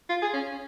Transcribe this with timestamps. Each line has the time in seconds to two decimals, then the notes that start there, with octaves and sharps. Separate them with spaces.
0.09 F4
0.22 G#4
0.33 C#4